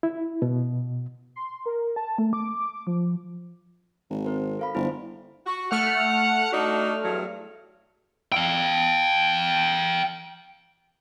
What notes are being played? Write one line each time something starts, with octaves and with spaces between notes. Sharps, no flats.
E4
B2
C6
A#4
A5
A3
D6
F3
G#1
C4 A#4 C5
A4 F5 B5
G1 E4 C5
F#4
A3 F#5 F6
D4 D#4 F#4
E2 G2 F#3
F5 G5